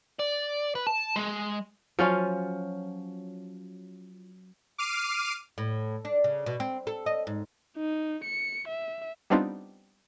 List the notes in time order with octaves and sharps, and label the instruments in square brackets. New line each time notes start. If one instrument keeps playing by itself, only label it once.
[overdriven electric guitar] D5
B4
A5
G#3
[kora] F3 C#4 F4 [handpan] F#3
[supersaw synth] D6 F6 C7 D#7
[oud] A2
D4
C#3
B2
C4
A4
D#5
G#2
[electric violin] D#4
C#7
E5
[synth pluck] G3 B3 C4 D4 D#4 F4